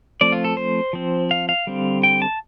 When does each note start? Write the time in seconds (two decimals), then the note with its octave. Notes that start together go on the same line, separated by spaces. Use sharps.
0.21 F3 A3 C4 D5
0.32 F4
0.44 A4
0.57 C5
0.93 F3 C4
1.31 F5
1.49 F5
1.67 D3 G3 C4
2.03 G5
2.22 A5